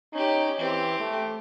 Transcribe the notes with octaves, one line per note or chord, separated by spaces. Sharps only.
C#4 D#4 G4
E3 C4 G4
A3